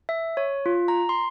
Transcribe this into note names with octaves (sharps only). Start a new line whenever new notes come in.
E5
C#5
F4
A#5
C6